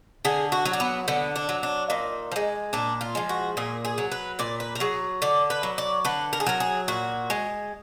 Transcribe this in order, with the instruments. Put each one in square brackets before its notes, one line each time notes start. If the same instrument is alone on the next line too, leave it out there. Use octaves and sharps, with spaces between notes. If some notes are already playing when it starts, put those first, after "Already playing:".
[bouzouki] D3 G#4
F#4
F#3
D4
B3
D3 B3
D4
F#3
D4
A#2 D#4
F3
G#3
A#2 D4
F4
F3 G#3
F#4
A#2 G#4
G#4
F#3
B4
A#2 D5
B4
A#4
F#3 G#4
D3 D5
B4
F#3
D5
D3 B4
A#4
G#4
F#3 A#4
G#4
A#2 F#4
G#3